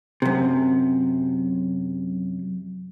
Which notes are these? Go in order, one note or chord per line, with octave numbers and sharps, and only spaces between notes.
F#2 C3